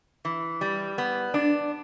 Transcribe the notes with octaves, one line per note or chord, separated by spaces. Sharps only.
E3
G3
B3
D4